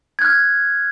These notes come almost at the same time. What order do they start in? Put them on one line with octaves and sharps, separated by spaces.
G#6 F#6 F6